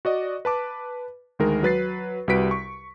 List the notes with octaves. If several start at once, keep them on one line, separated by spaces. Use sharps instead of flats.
F#4 D5 D#5
B4 A5 D6
D2 D#3 G#3 A#4
F#3 B4 A6 C7
C2 G3 F#4 B4 B6 D7
C#6